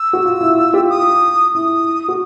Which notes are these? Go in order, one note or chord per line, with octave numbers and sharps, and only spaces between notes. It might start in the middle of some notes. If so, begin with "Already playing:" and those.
Already playing: E6
F#4
F4
E4
F4
F4 G4
D#6
E4 D#6
F#4